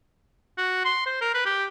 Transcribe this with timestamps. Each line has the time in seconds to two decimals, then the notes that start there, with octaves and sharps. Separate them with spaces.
0.58 F#4
0.85 C6
1.06 C5
1.21 A#4
1.34 B4
1.46 G4